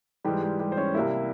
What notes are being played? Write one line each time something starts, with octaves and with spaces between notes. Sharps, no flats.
G#2 E3 G3 G#3 G4
G3 G4
G3 G4
C5
C#4 C#5
C2 C3 G3 A#3 E4 E5